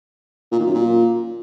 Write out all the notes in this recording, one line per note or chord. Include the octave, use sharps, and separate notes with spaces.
A#2
D#3
F#2
A#2